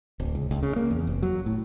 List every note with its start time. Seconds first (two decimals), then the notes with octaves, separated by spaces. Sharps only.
0.20 D1
0.35 C#2
0.51 C#2
0.63 C#3
0.76 A#3
0.91 E2
1.07 F1
1.23 F#3
1.46 A2